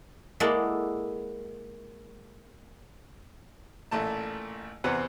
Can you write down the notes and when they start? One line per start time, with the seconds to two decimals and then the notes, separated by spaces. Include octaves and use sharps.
0.40 G#3 A#3 E4 F#4 A4 D5
3.91 A1 A#2 A3 A5
4.84 E2 C3 C4 B4 F#5